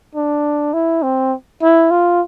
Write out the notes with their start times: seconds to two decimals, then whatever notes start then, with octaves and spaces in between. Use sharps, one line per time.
0.15 D4
0.73 E4
1.02 C4
1.62 E4
1.90 F4